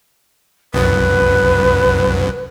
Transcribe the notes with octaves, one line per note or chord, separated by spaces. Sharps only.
C2 F#2 B4